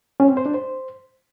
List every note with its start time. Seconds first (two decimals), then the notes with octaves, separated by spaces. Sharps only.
0.20 C#4
0.28 C4
0.37 C5
0.46 D4
0.54 C5